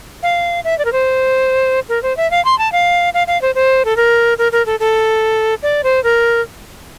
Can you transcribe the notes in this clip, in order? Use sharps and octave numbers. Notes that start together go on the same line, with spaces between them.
F5
E5
D5
A#4
C5
A#4
C5
E5
F5
C6
A5
F5
F5
F5
C5
C5
A4
A#4
A#4
A#4
A4
A4
D5
C5
A#4